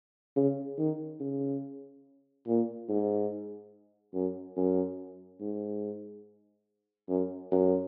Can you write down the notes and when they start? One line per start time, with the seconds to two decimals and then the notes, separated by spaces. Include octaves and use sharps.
0.36 C#3
0.78 D#3
1.20 C#3
2.47 A#2
2.89 G#2
4.14 F#2
4.57 F#2
5.41 G#2
7.09 F#2
7.51 F#2